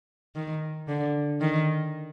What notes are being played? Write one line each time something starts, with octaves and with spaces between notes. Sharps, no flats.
D#3
D3
D#3